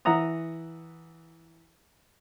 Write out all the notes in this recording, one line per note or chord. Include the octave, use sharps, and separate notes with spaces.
E3 E5 F#5 A#5 D#6